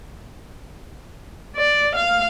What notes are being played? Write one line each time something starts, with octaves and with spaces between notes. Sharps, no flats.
D5
F5